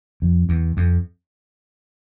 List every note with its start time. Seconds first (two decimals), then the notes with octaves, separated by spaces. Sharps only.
0.22 F2
0.49 E2
0.77 F2